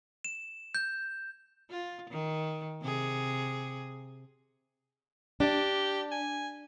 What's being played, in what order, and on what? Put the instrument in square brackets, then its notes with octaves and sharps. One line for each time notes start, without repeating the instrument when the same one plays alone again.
[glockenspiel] E7
G6
[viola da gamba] F4
D#3
C3 G#4
[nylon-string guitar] D4 [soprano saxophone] G4
[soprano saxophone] G#5